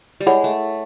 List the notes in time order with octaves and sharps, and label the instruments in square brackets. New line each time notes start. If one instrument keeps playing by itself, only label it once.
[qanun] G3
[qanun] G#3 [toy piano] E4 G#4 C#5 F#5 B5
[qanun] A3